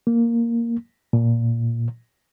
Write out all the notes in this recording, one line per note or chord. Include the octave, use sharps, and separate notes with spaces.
A#3
A#2